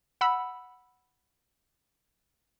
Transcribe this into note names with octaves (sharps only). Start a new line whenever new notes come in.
F#5 B5 E6